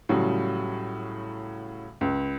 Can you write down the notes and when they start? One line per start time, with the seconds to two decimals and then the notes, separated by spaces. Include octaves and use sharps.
0.09 A2 C#3 F#3 G3
2.01 C#2